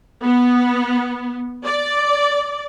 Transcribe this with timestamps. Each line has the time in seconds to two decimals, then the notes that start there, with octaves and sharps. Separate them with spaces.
0.23 B3
1.65 D5